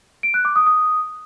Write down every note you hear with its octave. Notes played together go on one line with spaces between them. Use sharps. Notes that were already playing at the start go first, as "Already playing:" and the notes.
D7
F#6
D6
D#6
D#6